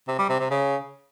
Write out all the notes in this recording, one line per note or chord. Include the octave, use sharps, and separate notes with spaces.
C3
G3
C3
C3
C#3